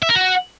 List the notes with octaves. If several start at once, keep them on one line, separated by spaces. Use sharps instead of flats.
E5
A#4
F#4